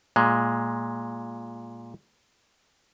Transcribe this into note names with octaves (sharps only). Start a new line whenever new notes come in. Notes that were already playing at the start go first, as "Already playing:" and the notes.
A#2 G#3